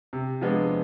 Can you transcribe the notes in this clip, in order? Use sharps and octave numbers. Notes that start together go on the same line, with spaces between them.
C3
F3 G#3 B3 D4